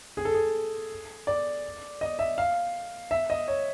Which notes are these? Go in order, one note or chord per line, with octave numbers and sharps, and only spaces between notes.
G#4
A4
G#4
D5
D#5
E5
F5
E5
D#5
C#5